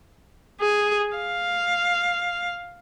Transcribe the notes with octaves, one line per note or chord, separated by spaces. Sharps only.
G#4
F5